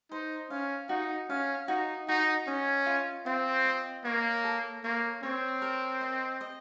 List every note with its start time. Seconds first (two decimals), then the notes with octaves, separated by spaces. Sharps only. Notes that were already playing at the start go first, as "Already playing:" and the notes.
0.11 D#4 C5
0.50 C#4 F5
0.89 D#4 F#4
1.29 C#4 F5
1.68 D#4 F#4
2.08 D#4 F#4
2.47 C#4 D#5
2.86 F4
3.26 C4 F4
3.65 D#5
4.04 A#3 C#5
4.44 A4
4.84 A#3 C#5
5.23 C4 C#5
5.62 A#4
6.01 D#5
6.41 D#5